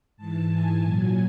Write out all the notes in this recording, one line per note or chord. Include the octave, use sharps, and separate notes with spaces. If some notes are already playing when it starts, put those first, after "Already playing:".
G#2 E3 A5
G#5
A#2 F#3 G#5